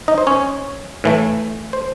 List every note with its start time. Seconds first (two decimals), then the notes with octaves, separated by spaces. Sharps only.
0.08 D#4 D#5
0.18 C5
0.27 C#4 C#5
1.04 A2 E3 A3
1.73 C5